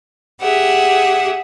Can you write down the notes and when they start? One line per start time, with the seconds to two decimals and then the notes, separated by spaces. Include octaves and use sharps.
0.41 G4 G#4 E5 F#5